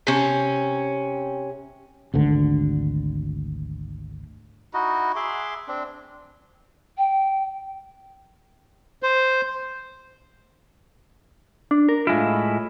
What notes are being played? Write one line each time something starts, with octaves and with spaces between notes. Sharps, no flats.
C3 C#4
G#1 D2 D3
D#4 E4 F#4 D#5
G#4 E5 C6 D6
C4 D4
G5
C5
D4
A#4
A2 G#3 E4 F4